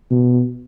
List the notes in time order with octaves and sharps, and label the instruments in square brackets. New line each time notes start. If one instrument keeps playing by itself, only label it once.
[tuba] B2